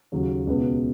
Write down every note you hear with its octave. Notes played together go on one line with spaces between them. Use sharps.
D#2 C#3 F#3
C#2 B2 B3